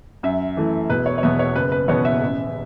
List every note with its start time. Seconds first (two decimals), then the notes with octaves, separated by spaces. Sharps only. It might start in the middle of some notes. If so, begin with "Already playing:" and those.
0.23 F#2 E5
0.57 E3 A3
0.90 E1 B4
1.06 C#5
1.18 C#5
1.23 E2 B2 B3 E5
1.39 C#5
1.56 F#1 B4
1.72 B4
1.88 E2 B2 B3 C#5
2.05 E5
2.21 A1